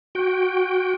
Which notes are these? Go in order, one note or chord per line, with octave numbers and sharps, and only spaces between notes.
F#4 G5